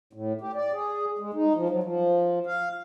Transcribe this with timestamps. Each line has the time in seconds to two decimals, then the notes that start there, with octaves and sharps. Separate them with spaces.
0.13 A2
0.41 G4
0.55 D5
0.73 G#4
1.19 G#3
1.34 D#4
1.54 F3
1.70 F#3
1.83 F3
2.46 F5